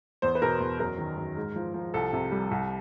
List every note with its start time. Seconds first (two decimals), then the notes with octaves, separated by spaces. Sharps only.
0.22 E2 C5
0.35 B4
0.42 B2 A#4
0.60 E2
0.80 F#2 A#4
0.98 D#3
1.17 F#2
1.37 G#2
1.56 F3
1.74 F3
1.94 C2 A4
2.13 C3
2.32 G3
2.51 C2